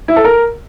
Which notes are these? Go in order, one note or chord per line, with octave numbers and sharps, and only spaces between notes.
E4
A4
A#4